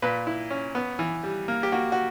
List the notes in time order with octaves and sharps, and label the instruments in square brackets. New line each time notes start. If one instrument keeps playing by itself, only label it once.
[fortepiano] A#2 B4
E4
C#4
B3
E3
G3
A#3
G4
A#3 F#4
F#4